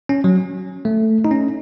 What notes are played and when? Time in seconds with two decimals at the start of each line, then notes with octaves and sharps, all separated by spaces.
0.09 C#4
0.24 F#3
0.85 A3
1.25 D#4
1.31 C#4